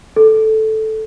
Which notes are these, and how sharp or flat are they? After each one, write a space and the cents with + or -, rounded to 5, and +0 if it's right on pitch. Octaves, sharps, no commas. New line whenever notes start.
A4 -5